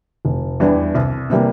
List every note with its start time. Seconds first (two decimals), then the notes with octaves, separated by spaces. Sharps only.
0.25 F1
0.60 E2 E3 G3 D4
0.95 C2
1.30 C3 E3 G3 A#3